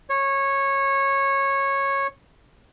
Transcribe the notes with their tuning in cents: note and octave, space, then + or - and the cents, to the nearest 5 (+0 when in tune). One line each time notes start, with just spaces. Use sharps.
C#5 -15